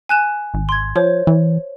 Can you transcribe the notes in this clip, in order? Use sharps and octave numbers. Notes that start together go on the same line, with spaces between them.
G#5 F#6 E7
G#1
C6 G#6
F3 C5 C#5
E3